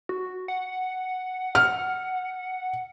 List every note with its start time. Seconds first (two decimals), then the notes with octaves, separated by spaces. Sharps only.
0.09 F#4
0.48 F#5
1.55 F6